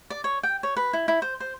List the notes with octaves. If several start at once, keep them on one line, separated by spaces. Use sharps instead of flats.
D5
C#5
G5
C#5
B4
E4
E4
C5
C5